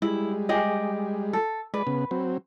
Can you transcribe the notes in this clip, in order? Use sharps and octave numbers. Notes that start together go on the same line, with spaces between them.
G3 G#3 E4
G4 G#4 D#5
A4
G#3 B4 D5
C#3 B3
F#3 C4